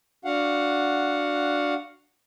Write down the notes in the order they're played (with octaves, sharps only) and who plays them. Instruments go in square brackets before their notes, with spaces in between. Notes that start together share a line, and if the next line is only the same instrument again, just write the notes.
[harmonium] D4 F#4 F5 F#5